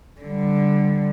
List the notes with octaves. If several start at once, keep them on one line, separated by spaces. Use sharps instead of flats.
D3 G3